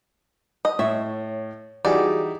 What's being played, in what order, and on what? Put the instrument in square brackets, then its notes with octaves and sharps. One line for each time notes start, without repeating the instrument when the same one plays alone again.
[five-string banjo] D#5
[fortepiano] A2 [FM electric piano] C#5 [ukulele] E5
[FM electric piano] E3 F#4 G#4 [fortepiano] G3 D#4 E4 [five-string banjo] D5